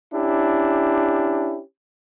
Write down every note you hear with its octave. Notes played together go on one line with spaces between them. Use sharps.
C#4 D4 E4 G4